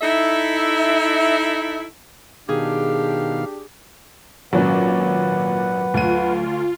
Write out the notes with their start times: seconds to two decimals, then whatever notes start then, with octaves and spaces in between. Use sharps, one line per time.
0.01 D#4 E4 A4 E5
2.49 B2 D#3 D4 G4 G#4 F5
4.53 G#1 A#2 F#3 C#4 B4 F#5
5.94 D2 F4 D#7